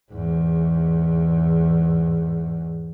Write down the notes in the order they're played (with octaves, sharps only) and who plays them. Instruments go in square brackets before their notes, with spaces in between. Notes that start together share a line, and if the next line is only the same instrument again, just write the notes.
[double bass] E2 G#2